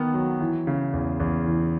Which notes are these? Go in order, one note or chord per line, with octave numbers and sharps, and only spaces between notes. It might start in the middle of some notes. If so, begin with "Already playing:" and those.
Already playing: D#3 B3
F#3
E3
C#3
E2
E2
E3